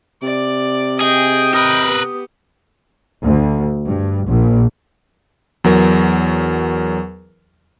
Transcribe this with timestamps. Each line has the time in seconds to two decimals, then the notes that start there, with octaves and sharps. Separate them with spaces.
0.22 C3 D5
1.01 G#4 D#5 G5
1.54 A#4 B4 D#6
1.86 B3 G4
3.23 D2
3.86 G2
4.27 A#1
5.64 E2 F#3 A#4